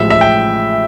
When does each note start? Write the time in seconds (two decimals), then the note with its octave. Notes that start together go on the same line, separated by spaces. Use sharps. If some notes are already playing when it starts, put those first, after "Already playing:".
Already playing: A1 A2 F3 G#3 E5
0.10 E5
0.21 G5